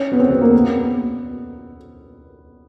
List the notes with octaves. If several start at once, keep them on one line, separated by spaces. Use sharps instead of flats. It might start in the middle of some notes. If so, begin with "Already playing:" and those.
Already playing: C#4
B3
C4
B3
A#3
B3